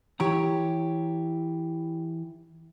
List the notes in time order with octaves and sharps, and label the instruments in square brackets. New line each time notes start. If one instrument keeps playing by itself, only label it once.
[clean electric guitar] E3 E4 A#5 [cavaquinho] G4 C#5